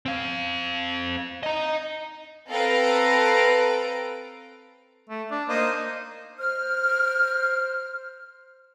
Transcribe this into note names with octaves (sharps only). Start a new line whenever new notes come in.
C4 F5
D#5 A#5
C4 A4 B4 F5 A#5 D7
A3
D4
A#3 D#4 C5 D#5
C5 F6